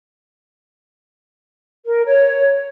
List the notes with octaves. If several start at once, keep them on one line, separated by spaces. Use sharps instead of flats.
A#4
C#5